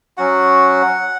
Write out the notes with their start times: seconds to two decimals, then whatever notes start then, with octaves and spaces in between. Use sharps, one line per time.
0.17 F#3 C#4 F#4 F#5